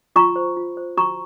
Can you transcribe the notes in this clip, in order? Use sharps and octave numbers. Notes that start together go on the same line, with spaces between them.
F4 A#5 C#6
C5
F4
C5
F#4 A#5 C#6